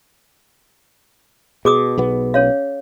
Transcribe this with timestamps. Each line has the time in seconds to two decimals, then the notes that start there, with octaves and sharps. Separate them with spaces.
1.65 B2 G#4 D6 D#6
1.98 B1 B2 B3
2.34 C#4 C#5 F5